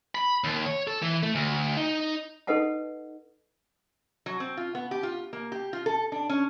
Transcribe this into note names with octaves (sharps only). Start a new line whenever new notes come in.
B5
D#2
C#5
A4
E3
A3
D2
D#4
D#4 A4 B4 D#5 F#5 A5
F#3
C4
F4
B3
G4
F4
A#3
G4
F4
A4
D4
C#4